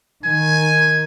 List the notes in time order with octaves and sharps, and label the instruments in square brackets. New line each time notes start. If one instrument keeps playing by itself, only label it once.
[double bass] D#3 [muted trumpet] G#5